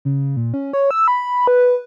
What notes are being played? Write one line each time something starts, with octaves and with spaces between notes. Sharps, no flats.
C#3
A#2
C#4
C#5
E6
B5
B4